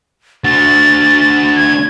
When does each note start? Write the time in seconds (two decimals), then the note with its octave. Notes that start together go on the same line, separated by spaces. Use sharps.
0.45 D3 F#4 A6
1.56 G#6